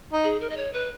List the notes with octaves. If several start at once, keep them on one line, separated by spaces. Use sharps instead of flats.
D#4
G#4
A#4
D#5
C#5
B4